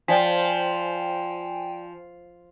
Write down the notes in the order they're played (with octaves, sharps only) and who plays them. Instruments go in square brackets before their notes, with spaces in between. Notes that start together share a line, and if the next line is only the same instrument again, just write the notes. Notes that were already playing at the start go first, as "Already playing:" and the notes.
[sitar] F3 [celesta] D5 B6 [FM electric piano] G5 G#5